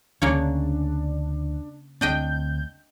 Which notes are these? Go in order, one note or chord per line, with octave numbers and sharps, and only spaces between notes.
D2 C#3 A#3 D4 C#5
D2 C4 D4 D#5 G5 G6